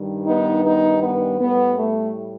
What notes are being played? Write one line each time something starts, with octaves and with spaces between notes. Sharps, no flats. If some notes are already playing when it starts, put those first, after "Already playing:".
Already playing: G2 D#3 G3
B3 D#4
B3 D#4
B3
A2 G3 B3
A3